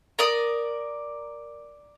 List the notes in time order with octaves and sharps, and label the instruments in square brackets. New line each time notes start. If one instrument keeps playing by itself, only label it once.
[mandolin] A#4 D5 D#6